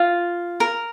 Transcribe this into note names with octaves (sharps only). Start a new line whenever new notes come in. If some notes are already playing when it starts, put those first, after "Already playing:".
Already playing: F4
A#4